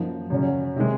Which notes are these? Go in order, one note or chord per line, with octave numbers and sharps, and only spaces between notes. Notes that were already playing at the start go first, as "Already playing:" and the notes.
Already playing: F#2 F3 A#3 D#4
F#2 C#3 F#3 C#4
C3 D#3 G#3